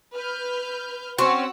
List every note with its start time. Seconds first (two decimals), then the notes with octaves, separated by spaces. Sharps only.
0.14 B4 F6 G6
1.18 C4 C#4 F#4 F#5 C#6 E6